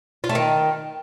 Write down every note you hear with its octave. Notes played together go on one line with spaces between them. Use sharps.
F4
A3
D#3